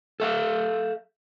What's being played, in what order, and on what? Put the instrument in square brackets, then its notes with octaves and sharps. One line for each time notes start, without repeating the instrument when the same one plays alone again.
[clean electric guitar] A4 E5 F5